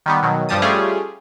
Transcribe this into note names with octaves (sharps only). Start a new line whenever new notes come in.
D#3 G3 B3
B2 D#3 F#3
G2 F3 G3 G4 A5 D#6
G3 A3 C#4 F4 G4 G#4